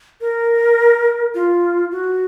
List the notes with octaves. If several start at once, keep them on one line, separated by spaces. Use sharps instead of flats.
A#4
F4
F#4